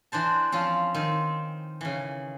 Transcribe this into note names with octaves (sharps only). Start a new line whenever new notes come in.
E3 D4 C5 A5
F3 C4 C#4 F4
D#3 C4
C#3 E3